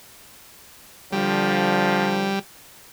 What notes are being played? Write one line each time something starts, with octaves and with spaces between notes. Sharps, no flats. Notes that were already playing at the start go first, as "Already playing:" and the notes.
D3 F3 G3